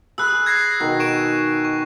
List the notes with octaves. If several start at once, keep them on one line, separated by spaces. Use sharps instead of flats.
G#4 B5 E6 F#6
G#6 A#6 C7
B2 D#3
C#6 D7 E7
C#6